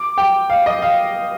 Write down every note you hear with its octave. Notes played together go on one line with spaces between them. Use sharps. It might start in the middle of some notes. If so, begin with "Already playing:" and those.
Already playing: D6
G5
F5
D#5
F5